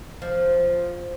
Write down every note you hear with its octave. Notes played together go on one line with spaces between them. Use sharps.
F3